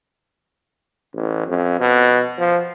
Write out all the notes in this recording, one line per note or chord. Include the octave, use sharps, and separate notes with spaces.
A1
F2
B2
F3